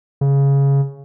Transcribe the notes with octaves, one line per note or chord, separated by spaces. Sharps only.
C#3